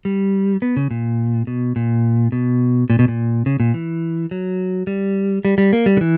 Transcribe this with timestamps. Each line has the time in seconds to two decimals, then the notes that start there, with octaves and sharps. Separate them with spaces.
0.05 G3
0.62 B3
0.77 C#3
0.91 A#2
1.47 B2
1.76 A#2
2.32 B2
2.90 A#2
2.99 B2
3.08 A#2
3.46 C#3
3.60 A#2
3.74 E3
4.31 F#3
4.87 G3
5.45 G3
5.58 G3
5.73 A#3
5.86 G3
5.97 D3
6.01 E3